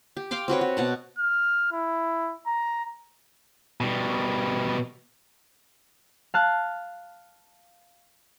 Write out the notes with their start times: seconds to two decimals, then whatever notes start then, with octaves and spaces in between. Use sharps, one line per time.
0.17 G4
0.31 F5 G5 C6 D6
0.48 C4 F#4 B4 C#5
0.61 F#4
0.77 B2 F#5 A5
1.18 F6
1.72 E4
2.47 A#5
3.81 B2 G3
6.34 F5 A5 F#6